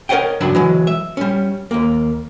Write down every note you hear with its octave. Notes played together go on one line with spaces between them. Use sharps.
A#4 B4 C#5 D#5 F#5 G5
C#2 G2 F#3 D4 B5
E3 F#3 G#3
E5
G3 C#4
D#2 A#3